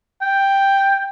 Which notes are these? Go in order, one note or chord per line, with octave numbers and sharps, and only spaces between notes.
G5